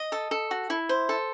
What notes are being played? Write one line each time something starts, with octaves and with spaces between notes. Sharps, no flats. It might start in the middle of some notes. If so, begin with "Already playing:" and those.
Already playing: D#5
A4
A4
F#4
E4
C5
A4